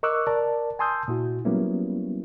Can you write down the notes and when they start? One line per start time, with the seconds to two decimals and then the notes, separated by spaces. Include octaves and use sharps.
0.03 A#4 D#5 C#6 D6 E6 F#6
0.27 A#4 D5 A5
0.79 G#5 A5 C6 D#6 E6 G6
1.08 A#2 E4 F#4
1.45 F#3 G3 A#3 B3 C#4 E4